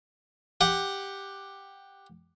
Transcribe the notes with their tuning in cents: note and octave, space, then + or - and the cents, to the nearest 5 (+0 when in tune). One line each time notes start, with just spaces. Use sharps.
G4 +5 F#5 +0